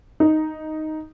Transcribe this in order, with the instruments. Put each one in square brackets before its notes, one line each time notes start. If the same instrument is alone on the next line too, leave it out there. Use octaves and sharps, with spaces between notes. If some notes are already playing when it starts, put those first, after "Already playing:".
[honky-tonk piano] D#4